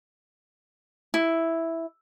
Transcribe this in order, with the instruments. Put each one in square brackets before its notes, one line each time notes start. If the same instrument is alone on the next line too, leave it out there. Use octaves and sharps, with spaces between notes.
[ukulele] E4